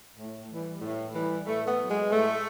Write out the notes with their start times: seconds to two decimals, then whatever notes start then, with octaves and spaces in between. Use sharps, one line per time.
0.17 A2
0.49 E3 G3
0.81 A2
1.14 E3 G3
1.45 A2 A3
1.67 B3
1.78 F#3
1.89 G#3
2.11 A2 A3